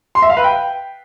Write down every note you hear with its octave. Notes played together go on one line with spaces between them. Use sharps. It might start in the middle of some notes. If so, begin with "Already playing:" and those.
C6
E5
F5
B4
G5